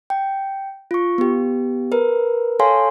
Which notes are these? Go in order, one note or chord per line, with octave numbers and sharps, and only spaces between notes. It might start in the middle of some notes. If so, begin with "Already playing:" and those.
G5
F4 C#6
B3 G4
A#4 B4
A4 C#5 F5 G#5 C6